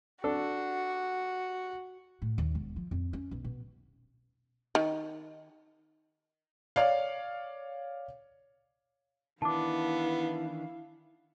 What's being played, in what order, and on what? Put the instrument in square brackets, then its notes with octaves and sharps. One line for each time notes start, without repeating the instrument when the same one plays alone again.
[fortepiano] D4 A4 [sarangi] F#4
[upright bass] A2
D#2
E1
F3
F2
C#4
B1
B2
[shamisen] D#3
[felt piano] C#5 D5 F5
[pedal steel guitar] D#3 E3 D4 [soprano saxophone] B3 [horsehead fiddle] E4 F5 [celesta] A5 D6